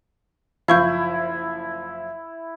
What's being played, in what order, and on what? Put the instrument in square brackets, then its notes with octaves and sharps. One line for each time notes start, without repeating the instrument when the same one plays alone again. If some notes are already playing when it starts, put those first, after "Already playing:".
[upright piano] F#1 F3 [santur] E4 [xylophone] F5 C#6 G6